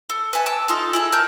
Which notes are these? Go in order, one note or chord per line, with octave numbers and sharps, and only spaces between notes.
A4
B4 E5 G#5 A5
A5 D6 E6
D#4 F4 A4
E4 G#4 A4
A#4 A5 G6